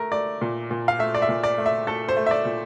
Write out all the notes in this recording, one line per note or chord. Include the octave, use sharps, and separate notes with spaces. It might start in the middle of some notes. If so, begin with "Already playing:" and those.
Already playing: A3 A#4
A3 D5
A#2
A#2
F5
A3 E5
D5
E5
A#2
D5
A3
E5
A3 A4
C5
A3
E5
D5
A#2